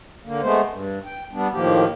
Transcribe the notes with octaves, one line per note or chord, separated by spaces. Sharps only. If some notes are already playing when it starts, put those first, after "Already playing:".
D3 A#3
G#3 A3 B3 C5
G2
G5
G3 B3 D4
A2 D#3 F3 A#3 G4